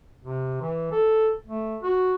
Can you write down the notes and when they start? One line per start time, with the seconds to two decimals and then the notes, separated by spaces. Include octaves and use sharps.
0.24 C3
0.61 E3
0.92 A4
1.47 A3
1.82 F#4